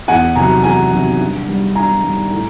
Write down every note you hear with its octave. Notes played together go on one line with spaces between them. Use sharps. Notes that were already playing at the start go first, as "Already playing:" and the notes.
E2 F#5 G#5
C3 D#3 F#3 G#5 A#5
E2 G#5 A#5
C3 D#3 F#3
G2
D#3 G3
G2 G#5 A#5
D#3 G3
A2